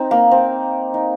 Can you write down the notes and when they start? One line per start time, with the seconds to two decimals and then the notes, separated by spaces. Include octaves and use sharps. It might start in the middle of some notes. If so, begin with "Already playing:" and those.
Already playing: C4 D#4
0.11 A#3
0.31 C4
0.94 D#4